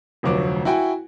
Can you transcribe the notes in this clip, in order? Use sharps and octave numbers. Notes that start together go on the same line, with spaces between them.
F1 D2 F3 F#3 D6
E4 F#4 G5 G#5